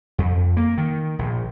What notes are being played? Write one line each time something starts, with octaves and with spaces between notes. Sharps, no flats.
F2
A#3
D#3
A#1